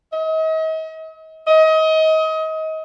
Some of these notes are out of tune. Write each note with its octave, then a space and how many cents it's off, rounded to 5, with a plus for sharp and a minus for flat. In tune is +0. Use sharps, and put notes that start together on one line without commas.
D#5 +40
D#5 +30